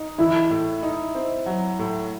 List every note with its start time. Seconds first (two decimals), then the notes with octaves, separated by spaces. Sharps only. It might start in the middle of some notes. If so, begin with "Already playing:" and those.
Already playing: D#4
0.18 E3 E4
0.51 A2
0.83 D#4
1.15 C4
1.46 F#3
1.79 A2